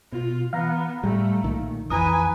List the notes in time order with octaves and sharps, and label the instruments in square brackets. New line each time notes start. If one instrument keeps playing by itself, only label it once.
[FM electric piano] B2 [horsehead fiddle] F4
[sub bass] E3 [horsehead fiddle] B3 [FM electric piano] F5 A#5
[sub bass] A2 [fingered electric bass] G3 [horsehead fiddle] A3
[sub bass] B1 [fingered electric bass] A#2 D#3
[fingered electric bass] F2 E3 [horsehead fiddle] B4 G#5 [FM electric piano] A#5 D#6